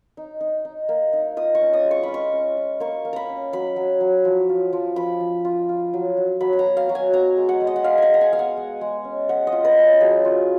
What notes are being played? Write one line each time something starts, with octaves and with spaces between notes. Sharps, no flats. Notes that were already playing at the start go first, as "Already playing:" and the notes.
D#4
D#4
D#4
A#3
D#4
F4 D#6
C#6
C#4
D#6
G#3
C#6
F4 B5
C#6
C#4
F4
A#3 C#6
A#3
A#5 B5
C#4
F#3 B5
F#3
F#3
F3
F4
F3
F3 B5
F3
F4
F4
F#3
F#3
F#3 B5
B5
A#5
B3
F5
F#3
G#5
B3 A#5
G#3
F#5
G#3
D#5
F#5
G#3 F5
F#5 G#5
G#3 A#5
G#5
B3 F5
F#5
G#3
G#3
C#4
G#3 F#5
D#5
F4
B4
C#4
F#3 G#4
F4